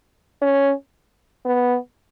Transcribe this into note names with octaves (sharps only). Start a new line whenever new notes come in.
C#4
B3